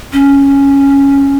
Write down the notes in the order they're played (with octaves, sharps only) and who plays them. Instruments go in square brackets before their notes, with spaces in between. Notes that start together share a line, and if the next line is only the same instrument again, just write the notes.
[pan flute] C#4